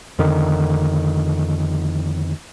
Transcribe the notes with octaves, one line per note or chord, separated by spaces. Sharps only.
F2 D3 D#3